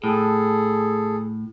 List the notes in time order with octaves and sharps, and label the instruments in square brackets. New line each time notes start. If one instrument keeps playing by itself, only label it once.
[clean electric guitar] A2 [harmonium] G#4 A4